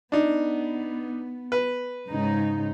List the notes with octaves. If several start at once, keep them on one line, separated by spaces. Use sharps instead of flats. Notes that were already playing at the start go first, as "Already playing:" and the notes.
B3 D4 D#4
B4
G#2 C#3 D#4